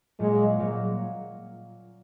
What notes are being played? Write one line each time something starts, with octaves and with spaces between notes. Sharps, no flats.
A#2 F#3 G#3 A#3 C#4
A#2 F#3 A#3 C#4